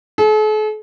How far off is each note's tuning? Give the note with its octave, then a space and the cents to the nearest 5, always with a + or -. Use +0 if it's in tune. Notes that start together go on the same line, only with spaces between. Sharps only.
A4 -45